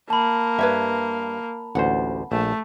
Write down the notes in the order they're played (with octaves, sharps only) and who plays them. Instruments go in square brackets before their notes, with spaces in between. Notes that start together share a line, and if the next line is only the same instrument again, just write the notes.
[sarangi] A#3 [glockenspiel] A5 B5
[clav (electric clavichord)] G2 [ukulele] B4 C#5 E5
[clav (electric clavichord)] A1 D2 C5 [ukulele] F#5
[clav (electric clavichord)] A#1 [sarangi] A3